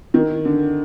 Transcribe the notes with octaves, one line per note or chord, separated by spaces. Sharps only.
D#3
D3